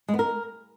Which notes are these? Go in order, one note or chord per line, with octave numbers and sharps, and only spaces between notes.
G#3
B3
A#4